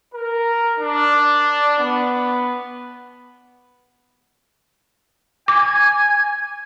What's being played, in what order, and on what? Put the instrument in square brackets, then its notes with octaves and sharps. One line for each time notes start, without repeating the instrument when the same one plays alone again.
[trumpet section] A#4
D4
B3
[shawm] G#5 [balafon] D6